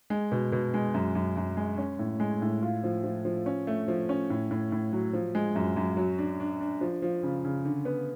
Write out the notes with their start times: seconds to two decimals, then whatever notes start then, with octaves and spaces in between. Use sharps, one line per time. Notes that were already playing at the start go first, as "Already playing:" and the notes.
0.10 G#3
0.32 B2
0.52 B2
0.74 G#3
0.94 F#2
1.15 F#2
1.37 F#2
1.57 G#3
1.78 C#4
1.99 A2
2.20 G#3
2.42 A2
2.62 F4
2.84 F3
3.04 F3
3.25 F3
3.46 C#4
3.67 A3
3.88 F3
4.09 C#4
4.30 A2
4.51 A2
4.72 A2
4.93 F#3
5.13 F3
5.35 G#3
5.55 F#2
5.76 F#2
5.97 F#3
6.18 D4
6.40 D4
6.61 D4
6.81 F3
7.02 F3
7.23 C#3
7.45 C#3
7.65 D3
7.85 B3